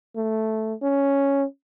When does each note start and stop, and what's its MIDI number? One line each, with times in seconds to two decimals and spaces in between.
0.16 0.74 57
0.82 1.44 61